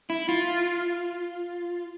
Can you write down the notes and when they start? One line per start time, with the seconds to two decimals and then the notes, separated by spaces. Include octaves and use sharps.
0.10 E4
0.29 F4